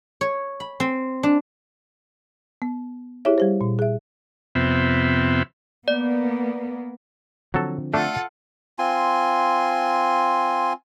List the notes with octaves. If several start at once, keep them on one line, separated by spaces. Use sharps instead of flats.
C#5
B5
C4
D4
B3
E4 G4 G#4 C#5 E5
G3 G4 C5
A#2
G#4 E5
F2 C3 B3 C4 E5
A#3 B3 D5
D3 F3 F#3 C4 A4
A3 D4 F4 A4 F#5
C4 F4 G#5 C6